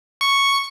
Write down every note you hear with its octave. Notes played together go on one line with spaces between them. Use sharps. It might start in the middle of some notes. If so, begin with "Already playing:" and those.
C#6